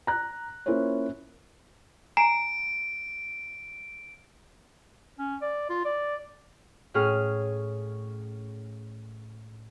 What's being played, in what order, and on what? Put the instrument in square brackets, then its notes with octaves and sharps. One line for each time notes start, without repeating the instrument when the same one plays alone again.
[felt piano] A#5 F#6
A#3 C#4 E4 F4 C5 C#5
[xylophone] G#5 A#5 C7 [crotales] D7
[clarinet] C#4
D5
F4
D5
[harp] A2 C#4 G#4 F6